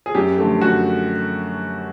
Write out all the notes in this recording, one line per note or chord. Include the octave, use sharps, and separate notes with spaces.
G#4
F#2 G4
D3 F3 A3
F#2 F#4